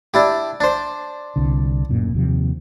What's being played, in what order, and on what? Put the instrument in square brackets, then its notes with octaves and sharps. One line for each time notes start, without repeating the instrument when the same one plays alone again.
[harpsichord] D4 E4 G4
D4 C5
[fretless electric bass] C2 D3
D1 F#2 A#2
D#2 C3 F3